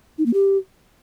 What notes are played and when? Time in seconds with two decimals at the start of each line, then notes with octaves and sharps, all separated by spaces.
0.18 D#4
0.26 A#3
0.34 G4